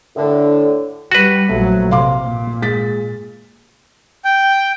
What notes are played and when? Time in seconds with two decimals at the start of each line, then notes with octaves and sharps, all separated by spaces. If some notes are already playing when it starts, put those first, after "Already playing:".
0.16 A2 D3
1.12 G3 F#4 B4
1.49 A#1 F#3 A3
1.91 C3 F5 C6 D6
2.22 A#2
2.62 G#3 A6 B6
4.25 G5